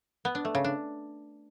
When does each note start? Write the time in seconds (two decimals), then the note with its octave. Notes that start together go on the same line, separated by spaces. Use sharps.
0.25 B3
0.35 D4
0.45 A3
0.55 C#3
0.65 D4